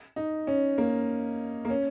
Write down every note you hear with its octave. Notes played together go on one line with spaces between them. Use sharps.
D#4
C#4
A#3
A#3
C#4